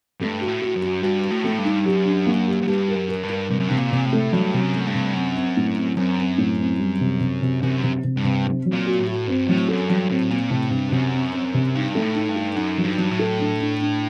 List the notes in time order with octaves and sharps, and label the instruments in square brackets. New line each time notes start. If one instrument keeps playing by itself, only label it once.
[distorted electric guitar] G2 [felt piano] A3
[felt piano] F#4
[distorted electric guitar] A2
[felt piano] F#4
[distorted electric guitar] F#2
[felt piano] F#4
[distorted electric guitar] G2 [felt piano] F#4
[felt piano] F#4
[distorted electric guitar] A2
[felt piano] A3
[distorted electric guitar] G2
[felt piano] D#4
[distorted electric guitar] F#2 [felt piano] G4
[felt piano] D4
A#3
G4
[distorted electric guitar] F#2
[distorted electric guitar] G2 [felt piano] G4
[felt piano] A#4
[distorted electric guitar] F#2
[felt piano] A#4
[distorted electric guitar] G2
[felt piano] A#4
[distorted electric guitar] G2 [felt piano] C3
[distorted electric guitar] F#2
[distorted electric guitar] G2 [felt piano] C3
[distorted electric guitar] A#2
[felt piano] C3
[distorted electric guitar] A2
[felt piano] A3
[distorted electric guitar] G2 [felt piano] F#3
[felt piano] C3
[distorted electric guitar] F#2
[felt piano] A3
[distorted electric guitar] G2
[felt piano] C3
[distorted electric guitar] F#2 [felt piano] C4
[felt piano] C4
A2
C4
[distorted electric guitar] F#2 [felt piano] C4
[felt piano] C4
A2
C4
G3
C3
C3
C3
[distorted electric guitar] F#2 [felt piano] C3
[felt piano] C3
C3
[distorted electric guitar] G2
[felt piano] C3
C4
F#3
[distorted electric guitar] A#2
[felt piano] F#4
[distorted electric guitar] A2
[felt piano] F#4
[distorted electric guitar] G2 [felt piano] C4
[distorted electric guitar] A2 [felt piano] F#3
[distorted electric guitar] F#2 [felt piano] A4
[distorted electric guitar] G2 [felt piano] F#3
[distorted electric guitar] A2 [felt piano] C4
[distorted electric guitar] A#2 [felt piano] C4
[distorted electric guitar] A2 [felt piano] C3
[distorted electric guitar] G2 [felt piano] C3
[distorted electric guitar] F#2 [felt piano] C3
[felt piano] C4
C4
C3
[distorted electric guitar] G2 [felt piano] D#4
[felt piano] A3
[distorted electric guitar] A2
[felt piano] D#4
[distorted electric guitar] G2
[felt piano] A4
[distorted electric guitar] F#2 [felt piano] D#4
[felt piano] F#3
[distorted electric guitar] G2
[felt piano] F#3
[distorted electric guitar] A2
[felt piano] A4
D4
D4
D4